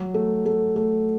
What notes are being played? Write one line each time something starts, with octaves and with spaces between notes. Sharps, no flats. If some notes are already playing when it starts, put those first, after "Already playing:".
Already playing: F#3
A3
A3
A3